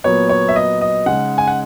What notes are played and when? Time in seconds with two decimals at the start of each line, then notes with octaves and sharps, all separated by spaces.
0.04 A#2 F#3 B3 C#5
0.29 C#5
0.48 E5
0.56 D#5
0.81 D#5
1.06 C#3 G#3 D#4 F#5
1.38 G#5
1.48 F#5